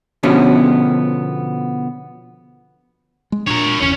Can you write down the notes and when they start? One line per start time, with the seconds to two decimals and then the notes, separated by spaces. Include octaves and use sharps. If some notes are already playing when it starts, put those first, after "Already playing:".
0.23 B2 D3 F3 B3 C#4
3.32 G#3
3.47 A#2 D4 A#4 C#5
3.80 G1 E2 C#3 C#4